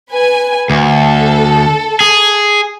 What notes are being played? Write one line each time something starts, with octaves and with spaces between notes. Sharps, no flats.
B4 G#5
D2 A4
G#4